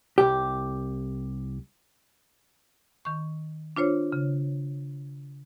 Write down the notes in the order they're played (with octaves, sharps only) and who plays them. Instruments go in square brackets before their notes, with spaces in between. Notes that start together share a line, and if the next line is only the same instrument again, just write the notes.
[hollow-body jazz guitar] C2 G4
[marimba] D#3 C#6
D4 F4 C5 C#5
C#3